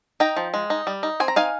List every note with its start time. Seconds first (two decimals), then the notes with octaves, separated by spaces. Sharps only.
0.20 D#4 G5 A#5
0.36 F3
0.54 G#3
0.70 D#4
0.87 G3
1.03 D#4
1.20 C4 G#5
1.28 A#5
1.36 D#4 F5 G#5